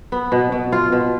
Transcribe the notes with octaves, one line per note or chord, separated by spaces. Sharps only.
B3
B2
B2
F4
B2